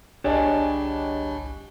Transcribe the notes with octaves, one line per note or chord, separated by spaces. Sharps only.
G1 C2 D4 G4 G#4 C#5 D#5 A5